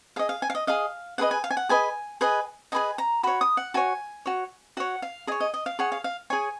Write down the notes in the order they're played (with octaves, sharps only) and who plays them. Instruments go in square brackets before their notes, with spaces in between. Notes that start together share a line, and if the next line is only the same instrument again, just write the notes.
[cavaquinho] G#4 D#5 F5
F5
G#5
F5
D#5
G#4 D#5 F5
G#4 B4 D#5 F#5
G#5
F5
G#5
F#5
G#4 B4 D#5 G#5
G#4 B4 D#5 G#5
G#4 B4 D#5 G#5
A#5
F#4 C#5 B5
D#6
F#5
F#4 C#5 G#5
F#4 C#5
F#4 C#5 F#5
F5
G#4 D#5
C#5
D#5
D#5
F5
G#4 C#5 F#5
F5
F5
G#4 C#5 G#5